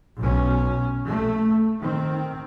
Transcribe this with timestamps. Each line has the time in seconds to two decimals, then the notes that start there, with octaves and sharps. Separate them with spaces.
0.20 B1 B2 C#4
1.08 A3
1.81 D#3 C4